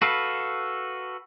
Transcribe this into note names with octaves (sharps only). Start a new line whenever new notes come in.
F#4 A4 B4 F5